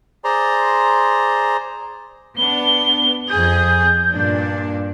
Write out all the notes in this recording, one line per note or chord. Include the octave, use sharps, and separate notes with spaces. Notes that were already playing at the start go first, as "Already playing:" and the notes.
G#4 C5 D5 A#5 C6
B3 D4 G7
F2 G#4 G6
G2 A#2 D4